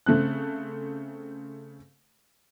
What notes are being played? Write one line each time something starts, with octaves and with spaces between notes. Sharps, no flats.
C#3 A3 C4 F#6